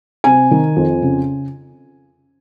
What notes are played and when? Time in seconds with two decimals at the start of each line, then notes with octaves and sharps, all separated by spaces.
0.24 C3 G#5
0.51 D#3
0.76 F2
1.02 C#3